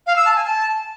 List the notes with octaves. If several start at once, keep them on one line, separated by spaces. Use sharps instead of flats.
F5
E6
A5
G#5
A5